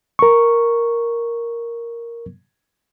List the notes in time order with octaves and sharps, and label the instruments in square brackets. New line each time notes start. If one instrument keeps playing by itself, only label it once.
[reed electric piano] A#4 C#6